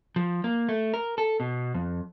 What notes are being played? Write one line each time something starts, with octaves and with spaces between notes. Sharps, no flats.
F3
A#3
A3
A#4
A4
B2
F2